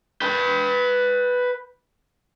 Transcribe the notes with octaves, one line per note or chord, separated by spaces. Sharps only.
B4 G5